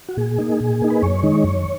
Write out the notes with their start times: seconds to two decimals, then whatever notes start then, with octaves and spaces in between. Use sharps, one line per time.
0.09 F#4
0.17 A#2 G#4
0.38 A#3 D#4
0.60 A#2
0.82 A#3 D#4
0.90 B4
1.02 F#2 C#5
1.23 D#3 G#3 D#4
1.44 F#2